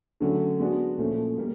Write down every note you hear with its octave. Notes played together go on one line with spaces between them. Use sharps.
D3 F#3 A3 C#4 F#4
G#3 B3 D4 F#4
A#2 F3 A3 C#4
A#2 G3 A#3